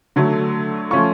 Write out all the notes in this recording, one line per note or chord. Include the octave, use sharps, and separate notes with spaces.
D3 F#3 A3
F3 A3 C#4 F4 C#6